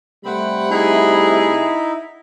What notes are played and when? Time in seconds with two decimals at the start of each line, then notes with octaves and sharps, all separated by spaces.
0.25 C3 G3 A3 C4 F#5 B5
0.71 D#4 E4 G#4